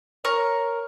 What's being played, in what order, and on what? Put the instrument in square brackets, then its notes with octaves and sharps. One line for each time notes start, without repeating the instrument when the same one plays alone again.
[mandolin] A#4 C#6 [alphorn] C#5